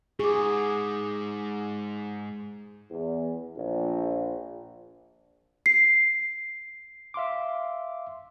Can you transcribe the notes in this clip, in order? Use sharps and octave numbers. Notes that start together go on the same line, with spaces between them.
G#2 G#4 C#6 D6
E2
A#1
C7
E5 F5 C6 D6